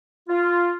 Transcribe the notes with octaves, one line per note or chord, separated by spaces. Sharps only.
F4